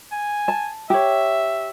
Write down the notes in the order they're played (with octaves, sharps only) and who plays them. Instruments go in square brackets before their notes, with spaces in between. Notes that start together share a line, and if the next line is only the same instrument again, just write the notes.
[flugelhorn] G#5
[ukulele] A5
[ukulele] G4 C#5 [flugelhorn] E5